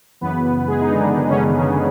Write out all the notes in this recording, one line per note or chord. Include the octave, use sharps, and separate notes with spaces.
F#2 C#3 E3 B3 B4
G#3 G#4
D#4
D3 D4
D#3 D#4
C#3 C#4
C#3 C#4
C#3 C#4